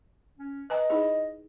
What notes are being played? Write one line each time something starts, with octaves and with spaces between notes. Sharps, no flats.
C#4
B4 D#5 G#5 A#5
D#4 E4 G#4